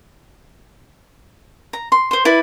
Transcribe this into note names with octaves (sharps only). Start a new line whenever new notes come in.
A#5
C6
C5 C6
E4 B4 D5